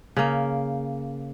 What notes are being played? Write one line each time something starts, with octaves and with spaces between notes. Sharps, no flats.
C#3 A#3